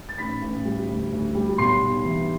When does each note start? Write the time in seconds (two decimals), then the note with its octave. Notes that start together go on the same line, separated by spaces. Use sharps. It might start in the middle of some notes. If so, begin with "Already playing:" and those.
0.09 A6
0.18 A1 B5 B6
0.42 A1
0.65 G3
0.89 D2
1.12 D2
1.35 G3
1.58 B1 C6 C7
1.82 B1
2.05 E3